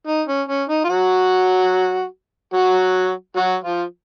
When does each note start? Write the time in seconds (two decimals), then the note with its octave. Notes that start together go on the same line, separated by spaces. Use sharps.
0.07 D#4
0.27 C#4
0.49 C#4
0.69 D#4
0.84 F4
0.89 F#3 F#4
2.53 F#3 F#4
3.36 F#3 F#4
3.64 F3 F4